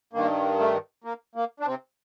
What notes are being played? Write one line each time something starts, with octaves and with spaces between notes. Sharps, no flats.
G2 D#3 A#3
A3
A#3
A#3
D4
C3 C4